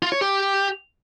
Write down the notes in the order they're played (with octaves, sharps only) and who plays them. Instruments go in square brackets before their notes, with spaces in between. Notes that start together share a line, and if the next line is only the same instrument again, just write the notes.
[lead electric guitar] F4
C#5
G4